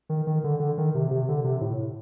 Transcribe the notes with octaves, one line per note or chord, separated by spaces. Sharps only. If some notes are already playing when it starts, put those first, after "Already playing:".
D#3
D#3
D3
D3
D#3
C3
C3
D3
C3
A2